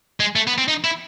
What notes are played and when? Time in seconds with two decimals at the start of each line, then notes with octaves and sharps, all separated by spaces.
0.20 G#3
0.36 A3
0.47 B3
0.58 C4
0.68 D#4
0.84 E4